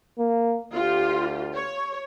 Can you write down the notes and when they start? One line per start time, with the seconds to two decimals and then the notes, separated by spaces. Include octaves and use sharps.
0.19 A#3
0.73 D2 F4 G4
1.54 C#5